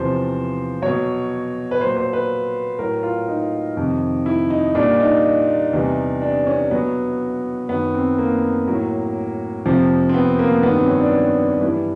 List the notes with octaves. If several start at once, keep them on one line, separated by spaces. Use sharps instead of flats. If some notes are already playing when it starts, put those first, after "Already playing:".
Already playing: E2 C3 F3 C5
B2 F#3 C#5
B4
A#2 F#3 C5
C5
B4
A2 F#3 A#4
F4
D#4
F2 C3 D#3
E4
D#4
A#2 G3 D4
D#4
E2 C3 E3 G3
D4
C#4
B2 F#3 B3
F#2 D#3 F#3 B3
C4
A#3
A2 F#3
F2 C3 F3
C4
B3
A#3
G2 D#3 F#3 B3
C4
C#4
D4
G2 E3 G3 E4